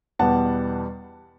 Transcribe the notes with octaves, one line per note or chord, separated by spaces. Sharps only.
E2 B2 G3 B3 F#5 A5